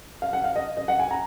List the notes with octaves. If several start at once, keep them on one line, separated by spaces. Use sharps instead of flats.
F5
F#5
F5
D#5
D#5
F#5
G#5
A#5